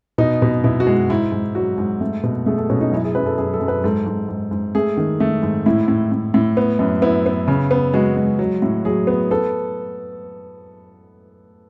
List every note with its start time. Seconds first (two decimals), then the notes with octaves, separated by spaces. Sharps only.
0.18 B2 D#4
0.42 B2
0.64 B2 E4
0.80 F#4
0.87 G#3
1.10 G#2 E4
1.32 G#2
1.55 F#3 F#4
1.78 G#2
2.01 A3
2.23 B2
2.46 A3 G#4
2.58 A4
2.69 B2 C#4
2.81 D#4
2.92 F#2 E4
3.04 G#4
3.15 F#2 B4
3.26 A4
3.38 F#2 G#4
3.54 A4
3.60 F#2
3.68 B4
3.84 G#2 A4
4.06 G#2
4.29 G#2
4.51 G#2
4.75 A3 G#4
4.97 D#3
5.20 A3
5.43 G#2
5.66 A2 E4
5.88 A2
6.12 A2
6.34 A2
6.57 B3
6.79 F#2
7.02 B3 E4
7.26 B3
7.48 C#3
7.71 B3
7.94 G#3 F#4
8.17 G#3
8.39 F#3
8.62 A2
8.85 F#3 G#4
9.07 B3
9.31 B3 A4